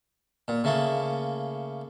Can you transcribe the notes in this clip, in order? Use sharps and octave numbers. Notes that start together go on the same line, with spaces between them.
A#2
C#3 A3 A#3